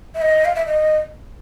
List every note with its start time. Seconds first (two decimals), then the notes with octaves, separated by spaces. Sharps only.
0.15 E5
0.22 D#5
0.45 F5
0.55 E5
0.66 D#5